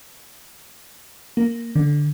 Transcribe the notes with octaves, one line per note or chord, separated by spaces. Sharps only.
A#3
D3